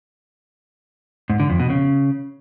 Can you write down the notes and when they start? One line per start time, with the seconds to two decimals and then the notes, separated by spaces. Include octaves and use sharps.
1.30 G#2
1.40 D3
1.50 F2
1.60 B2
1.70 C#3